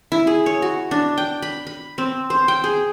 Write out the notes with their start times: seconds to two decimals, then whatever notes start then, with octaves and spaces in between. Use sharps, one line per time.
0.12 E4
0.27 G#4
0.46 C#5
0.62 F#4
0.91 D4
1.18 G5
1.42 B5
1.67 B5
1.98 C4
2.30 C5
2.48 G5
2.64 G#4